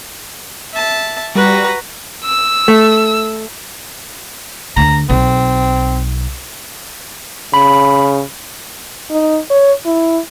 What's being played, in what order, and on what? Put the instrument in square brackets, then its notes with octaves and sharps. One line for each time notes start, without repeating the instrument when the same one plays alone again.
[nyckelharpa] E5 A5
[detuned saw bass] G3 [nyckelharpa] F#4 [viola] B4 A#5
[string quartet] E6
[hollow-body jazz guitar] A3
[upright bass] D2 [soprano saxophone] A#5
[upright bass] B1 [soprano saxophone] C4
[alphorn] C#3 [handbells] B5
[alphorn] D#4
C#5
E4